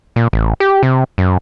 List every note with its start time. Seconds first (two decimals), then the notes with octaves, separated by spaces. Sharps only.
0.16 A#2
0.33 A1
0.60 G4
0.83 C3
1.18 F#2